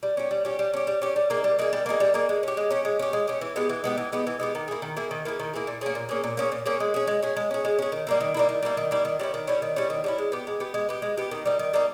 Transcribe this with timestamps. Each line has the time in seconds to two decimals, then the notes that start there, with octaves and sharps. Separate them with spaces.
0.03 G3
0.17 C#4 G4
0.31 G3
0.45 C#4 G4
0.59 G3
0.74 C#4 G4
0.87 G3
1.02 C#4 G4
1.16 G3
1.30 A#3 D#4 G#4
1.44 G3
1.59 A#3 D#4 G#4
1.73 G3
1.86 A#3 D#4 G#4
2.00 G3
2.14 A#3 D#4 G#4
2.29 G#3
2.43 C#4 G4
2.57 G#3
2.71 C#4 G4
2.85 G#3
2.99 C#4 G4
3.13 G#3
3.27 C#4 G4
3.41 E3
3.56 G#3 B3 G4
3.69 E3
3.84 G#3 B3 G4
3.98 E3
4.12 G#3 B3 G4
4.27 E3
4.40 G#3 B3 G4
4.55 D#3
4.68 A#3 E4 G#4
4.82 D#3
4.97 A#3 E4 G#4
5.11 D#3
5.25 A#3 E4 G#4
5.39 D#3
5.54 A#3 E4 G#4
5.67 A#2
5.81 A#3 C#4 G#4
5.95 A#2
6.09 A#3 C#4 G#4
6.24 A#2
6.37 A#3 C#4 G#4
6.52 A#2
6.66 A#3 C#4 G#4
6.80 G#3
6.94 C#4 G#4
7.07 G#3
7.22 C#4 G#4
7.36 G#3
7.51 C#4 G#4
7.65 G#3
7.79 C#4 G#4
7.92 D#3
8.07 G3 A#3 E4
8.21 D#3
8.34 G3 A#3 E4
8.49 D#3
8.63 G3 A#3 E4
8.77 D#3
8.91 G3 A#3 E4
9.05 D#3
9.19 G3 C#4 E4
9.34 D#3
9.47 G3 C#4 E4
9.62 D#3
9.76 G3 C#4 E4
9.90 D#3
10.04 G3 C#4 E4
10.18 G#3
10.32 B3 G4
10.47 G#3
10.60 B3 G4
10.74 G#3
10.89 B3 G4
11.02 G#3
11.17 B3 G4
11.31 D#3
11.46 G3 A#3 D#4
11.59 D#3
11.73 G3 A#3 D#4